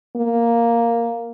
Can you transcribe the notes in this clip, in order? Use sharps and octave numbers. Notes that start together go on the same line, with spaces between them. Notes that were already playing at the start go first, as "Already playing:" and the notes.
A#3